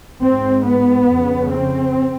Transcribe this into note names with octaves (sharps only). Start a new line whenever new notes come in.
G#2 C4
B3
F2 C#3
C4